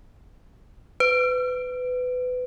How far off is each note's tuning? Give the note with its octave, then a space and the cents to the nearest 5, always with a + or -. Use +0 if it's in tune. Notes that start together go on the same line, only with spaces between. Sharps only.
B4 +25